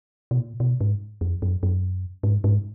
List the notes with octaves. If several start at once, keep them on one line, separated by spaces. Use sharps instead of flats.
B2
A#2
B2
G#2
F2
F#2
F#2
G#2
G#2